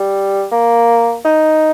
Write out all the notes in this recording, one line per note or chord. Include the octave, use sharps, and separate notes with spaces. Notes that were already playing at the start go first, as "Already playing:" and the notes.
Already playing: G3
A#3
D#4